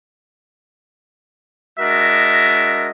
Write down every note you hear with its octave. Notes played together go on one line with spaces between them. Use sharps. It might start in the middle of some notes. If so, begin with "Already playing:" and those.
G#3 D4 F#4 A#4 D#5 E5